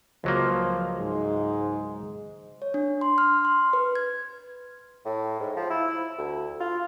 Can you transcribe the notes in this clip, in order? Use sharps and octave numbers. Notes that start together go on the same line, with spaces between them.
C#2 F3 F#3 A#3
G#2 G#3
C#5
D4
C6
F6
C6
B4
G#6
A2
G#2
F3
E4
D2
F4